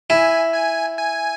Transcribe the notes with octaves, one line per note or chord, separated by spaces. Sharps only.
E4 G#5
G#5
G#5